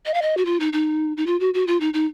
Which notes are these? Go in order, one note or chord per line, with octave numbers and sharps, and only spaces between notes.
D#5
F5
D#5
F#4
F4
D#4
D#4
D#4
F4
F#4
F#4
F4
D#4
D#4